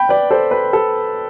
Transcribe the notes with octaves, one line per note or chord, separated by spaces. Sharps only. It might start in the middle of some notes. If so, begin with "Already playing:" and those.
Already playing: G5 B5
B4 D5
A4 C5
B4
A4